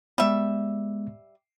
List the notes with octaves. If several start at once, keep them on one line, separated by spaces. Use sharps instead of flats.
G3 G#3 B3 E5